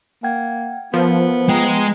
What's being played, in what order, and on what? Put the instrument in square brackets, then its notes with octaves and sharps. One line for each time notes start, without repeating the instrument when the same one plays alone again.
[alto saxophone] A#3 [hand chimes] F#5 G5 G#6
[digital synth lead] F3 [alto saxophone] B3 [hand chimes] A#4 C5
[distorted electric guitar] G#3 [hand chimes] G5 A#5